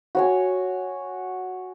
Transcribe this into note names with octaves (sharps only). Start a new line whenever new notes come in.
F#4 C#5 G#5